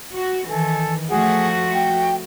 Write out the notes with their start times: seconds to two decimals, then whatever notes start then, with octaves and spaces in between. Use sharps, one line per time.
0.13 F#4
0.48 D#3 E3 A4 G#5
1.09 F3 A3 F#4 G#4 F#5
1.73 G5